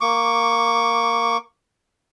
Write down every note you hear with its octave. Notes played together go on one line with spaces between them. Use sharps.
A#3 C#6 D6